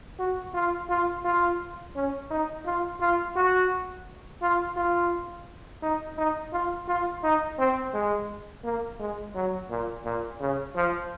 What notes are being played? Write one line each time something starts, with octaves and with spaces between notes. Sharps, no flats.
F#4
F4
F4
F4
C#4
D#4
F4
F4
F#4
F4
F4
D#4
D#4
F4
F4
D#4
C4
G#3
A#3
G#3
F#3
A#2
A#2
C#3
F3